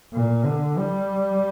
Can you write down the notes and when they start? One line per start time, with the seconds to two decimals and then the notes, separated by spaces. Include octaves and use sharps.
0.13 A#2
0.45 D3
0.78 G3